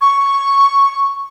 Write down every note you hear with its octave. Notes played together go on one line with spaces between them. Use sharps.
C#6